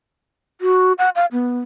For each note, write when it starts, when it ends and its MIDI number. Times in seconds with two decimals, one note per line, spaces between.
0.61 0.93 66
0.98 1.10 78
1.16 1.26 77
1.32 1.59 59